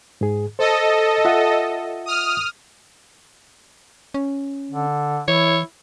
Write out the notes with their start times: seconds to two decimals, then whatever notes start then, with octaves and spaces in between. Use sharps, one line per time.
0.21 G#2 G#4
0.59 A4 C5 D#5
1.25 F4 E5 F#5
2.06 D#6 F6
4.14 C#4
4.71 D3
5.28 E3 E4 C#5